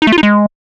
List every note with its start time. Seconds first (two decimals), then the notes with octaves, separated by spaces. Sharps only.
0.02 D#4
0.07 A3
0.12 F4
0.18 D#4
0.23 G#3